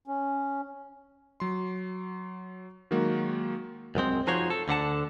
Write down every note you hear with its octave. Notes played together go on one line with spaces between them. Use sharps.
C#4
F#3 C6
D#3 F#3 G#3 A#3 F#4
C2 F#2 G#3 C4
F3 D#4 F#4 G#4 C5 C#5
A4
D2 D3 F#5 A5